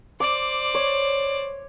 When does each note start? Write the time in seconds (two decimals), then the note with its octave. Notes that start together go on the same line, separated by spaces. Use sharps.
0.20 C5 D5 D6
0.75 C#5